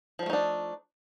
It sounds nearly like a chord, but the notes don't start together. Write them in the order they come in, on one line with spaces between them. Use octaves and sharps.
F3 G3 A3 D#4 D4